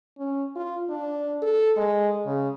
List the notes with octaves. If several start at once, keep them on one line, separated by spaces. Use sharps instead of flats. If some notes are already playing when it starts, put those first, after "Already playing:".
C#4
F4
D4
A4
G#3
C#3